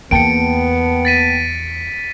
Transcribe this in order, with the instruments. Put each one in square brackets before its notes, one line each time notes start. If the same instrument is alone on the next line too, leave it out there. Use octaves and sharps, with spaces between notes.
[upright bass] E2 [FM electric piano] A#3 G5 A5 [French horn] B3 [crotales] C#7 D7
[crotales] A6 B6 D#7